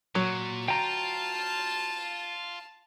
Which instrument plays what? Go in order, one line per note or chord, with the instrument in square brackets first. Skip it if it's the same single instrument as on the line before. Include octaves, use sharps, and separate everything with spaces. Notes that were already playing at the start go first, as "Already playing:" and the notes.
[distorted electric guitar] A#2 [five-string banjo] F#3
[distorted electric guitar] F4 [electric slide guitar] G5 A#5 [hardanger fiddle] A5